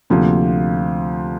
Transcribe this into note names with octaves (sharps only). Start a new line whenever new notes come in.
D2 C3 F3 A#3